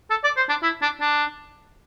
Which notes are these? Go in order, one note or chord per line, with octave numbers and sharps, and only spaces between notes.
A4
D5
C5
D4
E4
D4
D4